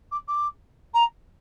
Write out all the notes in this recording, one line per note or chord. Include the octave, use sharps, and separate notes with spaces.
D6
D6
A#5